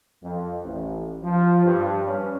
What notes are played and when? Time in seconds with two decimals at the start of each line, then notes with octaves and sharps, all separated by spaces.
0.22 F2
0.63 A1
1.22 F3
1.64 G2
2.07 C#4